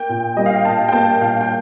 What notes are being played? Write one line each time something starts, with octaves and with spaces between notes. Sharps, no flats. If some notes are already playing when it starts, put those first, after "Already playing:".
Already playing: A#3 G5
A#2
G3 D#5
F5
G5
A#2 A5
G5
A#3 A5
A#2 F5
G5